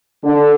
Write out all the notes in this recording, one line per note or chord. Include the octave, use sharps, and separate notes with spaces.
D3